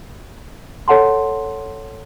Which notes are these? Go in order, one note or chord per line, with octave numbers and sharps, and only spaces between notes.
A4 C#5 F#5 A5 C6